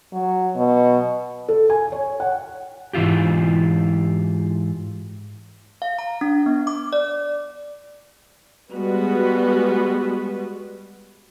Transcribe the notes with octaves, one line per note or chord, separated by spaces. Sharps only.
F#3
B2
A4
G#5
C#5
F#5
G#2 E3 E4 F4 G4
F5
A#5
D4
B3
D6
D5
G3 G#3 B3 F#4 B4